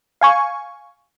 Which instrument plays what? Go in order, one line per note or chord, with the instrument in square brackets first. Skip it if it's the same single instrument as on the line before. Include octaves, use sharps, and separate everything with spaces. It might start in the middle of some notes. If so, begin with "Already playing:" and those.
[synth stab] F5 G#5 C#6